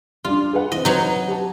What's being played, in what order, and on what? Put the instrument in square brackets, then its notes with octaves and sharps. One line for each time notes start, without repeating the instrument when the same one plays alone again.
[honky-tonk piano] G3 D4 [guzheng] F4
[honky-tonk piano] G#4 B4 F#5
[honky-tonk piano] E3 C4 [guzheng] D#5
[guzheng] F#3 D#4 [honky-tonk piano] C4 B4
[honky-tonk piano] G4 A5